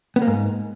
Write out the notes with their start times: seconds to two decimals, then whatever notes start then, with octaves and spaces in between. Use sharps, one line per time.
0.16 B3
0.22 A#3
0.27 G#2